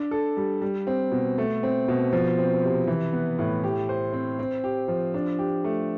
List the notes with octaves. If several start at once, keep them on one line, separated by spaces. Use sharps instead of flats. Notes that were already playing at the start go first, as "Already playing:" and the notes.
Already playing: D4
A4
G3
G3
C4
B2
A3
C4
B2
F3
C4
C3
E3
B3
A2
G4
C5
C4
C4
G4
F3
D4
G4
A3